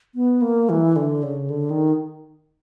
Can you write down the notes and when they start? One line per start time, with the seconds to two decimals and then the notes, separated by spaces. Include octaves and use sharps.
0.15 B3
0.42 A#3
0.69 E3
0.96 D3
1.23 C#3
1.50 D3
1.70 D#3